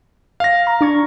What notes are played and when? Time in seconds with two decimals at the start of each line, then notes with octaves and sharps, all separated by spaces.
0.40 F5 A#6
0.67 A#5
0.81 D4 C#6 G#6